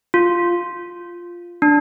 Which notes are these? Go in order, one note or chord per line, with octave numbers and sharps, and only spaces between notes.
F4
D4